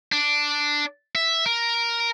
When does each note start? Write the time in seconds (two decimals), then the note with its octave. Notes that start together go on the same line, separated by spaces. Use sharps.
0.12 D4
1.15 E5
1.46 A#4